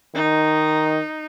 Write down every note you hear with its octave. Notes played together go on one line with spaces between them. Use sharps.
D#3 D#4